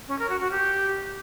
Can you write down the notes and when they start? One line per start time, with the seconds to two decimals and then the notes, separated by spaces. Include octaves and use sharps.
0.08 C#4
0.19 A#4
0.30 F#4
0.40 F#4
0.51 G4